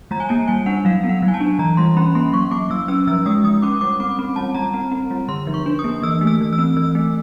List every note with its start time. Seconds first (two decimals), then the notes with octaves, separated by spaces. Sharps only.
0.11 G3 A#5
0.20 G#5
0.29 A#3 A5
0.48 G3 G#5
0.66 D4 F#5
0.85 F#3 F5
1.03 B3
1.09 F#5
1.22 F#3
1.28 G#5
1.34 A5
1.40 D4
1.59 E3 A#5
1.77 G3 C6
1.97 C#4 B5
2.15 A#3 C6
2.33 F#3 C#6
2.51 A#3 D6
2.70 F#3 E6
2.88 C#4 E6
3.07 F3 E6
3.26 G#3 D#6
3.44 F3 D#6
3.62 C#4 D6
3.81 G3 D6
4.00 C4 D6
4.19 C4
4.36 G3 A5
4.54 G3 A#5
4.74 C4
4.92 C4
5.11 G3
5.28 D3 C6
5.47 F3
5.54 C#6
5.66 D4
5.79 D#6
5.84 A#3
6.02 E3 E6
6.21 A3
6.27 E6
6.40 E3
6.53 E6
6.58 C4
6.76 E3 E6
6.95 A3